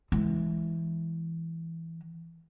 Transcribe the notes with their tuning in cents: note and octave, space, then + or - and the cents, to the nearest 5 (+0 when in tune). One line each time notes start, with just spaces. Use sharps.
E3 +0 G#3 +0